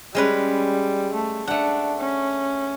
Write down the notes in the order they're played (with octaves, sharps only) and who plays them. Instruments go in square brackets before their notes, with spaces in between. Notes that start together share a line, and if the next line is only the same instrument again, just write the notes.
[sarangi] G3 [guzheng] G#3 C#4 B4
[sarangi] A3
[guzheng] A3 F#5 [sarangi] D4
[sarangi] C#4